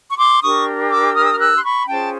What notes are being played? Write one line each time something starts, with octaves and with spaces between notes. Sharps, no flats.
C#6
C6 D6
D4 G4 A#4 C#6 D#6
D6 E6
D#6 F6
E6
F6
E6 F#6
C6
B5 C#6
C#4 F4 G#4 C5 G5 A5